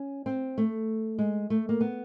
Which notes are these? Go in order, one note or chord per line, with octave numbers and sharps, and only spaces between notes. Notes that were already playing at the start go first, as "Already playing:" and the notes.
Already playing: C#4
C4
A3
G#3
A3
A#3
B3